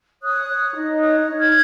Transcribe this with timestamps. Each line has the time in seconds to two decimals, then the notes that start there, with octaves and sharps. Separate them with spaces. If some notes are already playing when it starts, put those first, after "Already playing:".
0.23 C#5 D#6 F#6
0.49 C#5
0.74 D#4
0.99 C#5 D#6 F#6
1.25 D#4
1.38 F6 G#6